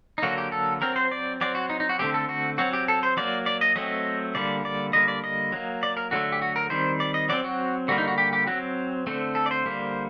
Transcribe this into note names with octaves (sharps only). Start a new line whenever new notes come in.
D#4
D3 F#3 A#3 F#4
G4
A4
F#3 C4 A#4
C5
D5
F#3 C4 D5
F#4
D#4
D#4
F#4
D3 A3 C4 G4
A4
F#4
F#3 C4 F#4
G4
A4
C5
F#3 A#3 D5
D5
D#5
F#3 A3 C4 D#5
D3 G3 A#3 D5
D5
D3 G3 A#3 D#5
D5
D#5
F#3 A#3
D5
A#4
D3 F#3 A3 F#4
G4
F#4
A#4
D#3 G3 C4 C5
D5
D#5
F#3 C4 D5
F#4
D3 G3 A#3 F#4
D#4
F#4
G4
G4
F#3 C4 F#4
D3 A3 C4
A4
D5
C5
D3 G3 A#3